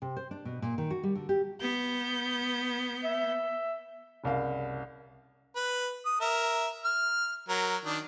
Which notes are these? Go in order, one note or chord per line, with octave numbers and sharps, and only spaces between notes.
C3
C5
D4
B2
A#2
D#3
F#4
G3
D3
G4
B3 G6
E5
F#1 C2 A#4 F5
B4
D#6
A#4 E5
F6
F#3 A#4
D#3 D4